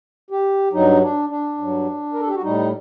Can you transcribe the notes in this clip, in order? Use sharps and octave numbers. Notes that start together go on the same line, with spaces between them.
G4
G2 F#3 D#4
D4
D4
G2 F#3
A#4
A4
G4
F#4
A2 G3 D#4